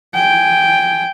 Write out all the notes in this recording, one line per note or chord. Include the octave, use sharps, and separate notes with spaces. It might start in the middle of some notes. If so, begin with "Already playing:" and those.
G5 G#5